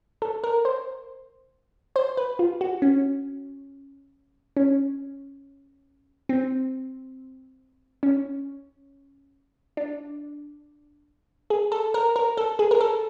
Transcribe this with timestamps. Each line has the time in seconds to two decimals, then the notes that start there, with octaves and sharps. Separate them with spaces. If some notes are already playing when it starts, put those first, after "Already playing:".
0.22 A4
0.44 A#4
0.65 C5
1.96 C5
2.17 B4
2.39 F4
2.61 F#4
2.82 C#4
4.57 C#4
6.29 C4
8.03 C#4
9.77 D4
11.50 G#4
11.72 A4
11.94 A#4
12.16 A#4
12.37 A4
12.59 G#4
12.71 A#4
12.81 A4